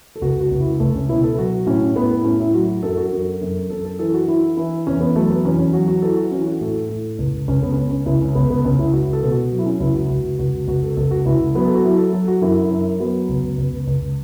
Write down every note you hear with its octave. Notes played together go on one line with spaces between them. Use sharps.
A4
C#2 F#4
F#4
C#2
E4
C#2 A3
C#4
B2 E4
A4
F#3 F#4
A2 C#4
A2 B3
B3
E4
A2 C#4
E4
F#3 F#4
F#4
F#2 A4
F#4
F#2 A4
F#2
F#2 A4
A4
E3 A4
F#4
E3 E4
E3 E4
E2 C#4
B3
F#3 A3
B3
E2 C#4
C#4
F#3 F#4
F#4
E3 A4
F#4
E3 C#4
F#4
A2 A4
A2
C#2
C#2 C#4
B3
C#4
C#2 B3
C#4
C#2 E4
C#4
C#2 B3
B3
C#2 C#4
E4
C#2 F#4
A4
B2
F#4
F#3
E4
C#4
C#2 E4
F#4
C#2 F#4
C#2 F#4
C#2 F#4
A4
C#2 A4
F#4
C#2 E4
F#3 B3
A4
F#4
F#3 E4
A4
F#3 A4
F#4
F#2 E4
F#2
F#3 B3
C#2
C#2
C#2